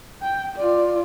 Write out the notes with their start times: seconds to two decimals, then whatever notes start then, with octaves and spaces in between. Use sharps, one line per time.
0.22 G5
0.56 F4 D5